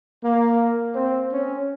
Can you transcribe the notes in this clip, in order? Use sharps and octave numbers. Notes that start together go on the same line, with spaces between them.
A#3
C4
C#4